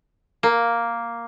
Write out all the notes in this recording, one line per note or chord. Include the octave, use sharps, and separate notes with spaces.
A#3